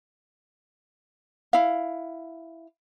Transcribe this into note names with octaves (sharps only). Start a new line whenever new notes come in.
E4 F5